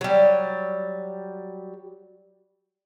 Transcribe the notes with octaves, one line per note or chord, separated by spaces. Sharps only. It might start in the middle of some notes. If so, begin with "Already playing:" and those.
F#3 G3